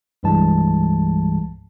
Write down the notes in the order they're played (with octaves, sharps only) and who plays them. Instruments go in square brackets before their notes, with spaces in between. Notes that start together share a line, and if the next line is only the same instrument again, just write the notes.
[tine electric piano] C2 G2 E3 G3 G#3 A5